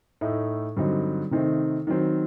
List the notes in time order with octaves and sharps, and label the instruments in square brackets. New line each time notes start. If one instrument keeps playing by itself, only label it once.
[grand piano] A2 A3 D#4
G2 D3 F#3 C4 D#4
C3 D#3 A3 C4 D#4
D#3 F#3 C4